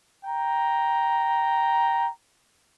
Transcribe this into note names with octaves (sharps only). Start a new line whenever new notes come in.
G5 A#5